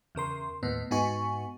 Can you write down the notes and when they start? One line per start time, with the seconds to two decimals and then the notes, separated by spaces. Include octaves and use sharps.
0.15 E2 C#3 A#4 C6
0.63 D#2 A2 B3
0.91 G#2 B3 D#4 F#4 G#5 C#6